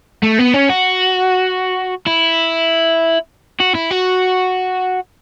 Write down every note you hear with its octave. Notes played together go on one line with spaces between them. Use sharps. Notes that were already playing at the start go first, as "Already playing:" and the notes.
A3
B3
C#4
F#4
E4
F#4
E4
F#4